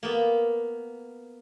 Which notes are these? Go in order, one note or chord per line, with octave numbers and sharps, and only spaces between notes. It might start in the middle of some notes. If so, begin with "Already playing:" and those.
A#3 B3